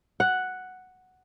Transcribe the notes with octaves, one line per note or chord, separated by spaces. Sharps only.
F#5